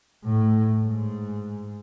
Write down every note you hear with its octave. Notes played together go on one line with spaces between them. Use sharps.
A2
G#2